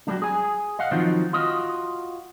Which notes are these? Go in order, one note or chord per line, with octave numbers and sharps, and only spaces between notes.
F#3 G3 A3 D4
G#4 G#5
D#5 F5 F#5
D#3 F3 F#3 C4 D#4
F4 F#4 D#5